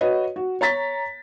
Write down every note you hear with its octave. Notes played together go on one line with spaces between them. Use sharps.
F#4 B4 C#5 D#5
F#4
C#5 A#5 A6 B6